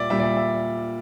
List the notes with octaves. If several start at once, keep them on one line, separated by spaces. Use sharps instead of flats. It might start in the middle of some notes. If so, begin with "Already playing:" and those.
Already playing: A#2 G3 D5 E5
A#2 G3 E5
D5
E5
E5